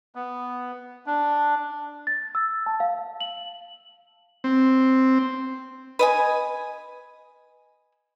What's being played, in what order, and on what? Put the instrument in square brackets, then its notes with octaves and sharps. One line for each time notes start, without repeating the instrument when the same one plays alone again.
[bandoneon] B3
D4
[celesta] A6
E6
A5
F5
F#7
[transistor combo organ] C4
[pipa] B4 D#5 G#5